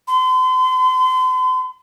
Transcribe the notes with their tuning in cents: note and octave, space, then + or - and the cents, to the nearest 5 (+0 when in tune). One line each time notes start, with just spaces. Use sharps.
C6 -40